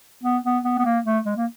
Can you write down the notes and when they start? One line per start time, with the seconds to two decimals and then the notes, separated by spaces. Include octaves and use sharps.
0.24 B3
0.44 B3
0.64 B3
0.79 B3
0.85 A#3
1.05 A3
1.25 G#3
1.36 A#3